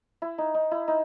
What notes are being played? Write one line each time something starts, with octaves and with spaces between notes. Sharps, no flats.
E4
D#4
D#4
E4
D#4